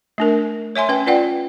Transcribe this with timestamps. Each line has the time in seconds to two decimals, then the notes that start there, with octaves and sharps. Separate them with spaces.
0.18 A3 D4 A#4
0.76 C#5 E5 G#5 C6
0.89 C#4 B4 G5
1.06 F4 B4 D5 F#5 G5